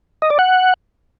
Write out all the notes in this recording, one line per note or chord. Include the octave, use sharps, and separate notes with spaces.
D#5
D5
F#5